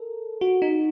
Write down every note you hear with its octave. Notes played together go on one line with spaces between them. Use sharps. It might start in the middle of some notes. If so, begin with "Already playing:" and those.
Already playing: A4 A#4
F#4
D#4